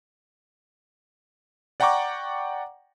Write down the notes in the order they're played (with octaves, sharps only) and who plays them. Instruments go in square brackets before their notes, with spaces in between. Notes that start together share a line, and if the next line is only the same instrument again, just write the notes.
[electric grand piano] D5 F#5 G5 A#5 C#6 D6